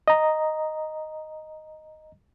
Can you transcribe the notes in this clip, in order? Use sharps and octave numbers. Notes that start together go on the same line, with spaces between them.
D#5 A#5